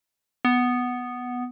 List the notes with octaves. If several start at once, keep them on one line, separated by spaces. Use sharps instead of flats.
B3